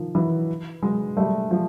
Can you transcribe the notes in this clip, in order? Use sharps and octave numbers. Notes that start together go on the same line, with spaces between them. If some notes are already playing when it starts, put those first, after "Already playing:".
Already playing: D#3 F3
E3 F#3
F#3 G#3
G3 A3
F3 G3